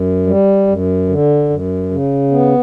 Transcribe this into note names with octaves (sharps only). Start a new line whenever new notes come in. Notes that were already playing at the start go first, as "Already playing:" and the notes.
Already playing: F#2
G3
F#2
D3
F#2
C#3
B3